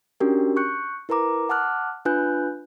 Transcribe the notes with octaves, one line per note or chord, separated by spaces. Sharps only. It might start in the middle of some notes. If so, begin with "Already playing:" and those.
C#4 D4 F#4 G4 A#4
C#6 F#6 G6 C#7
E4 A#4 B4 A#5 D6
F#5 A5 D6 F6 F#6
D4 F4 B4 G#5 F#6 G6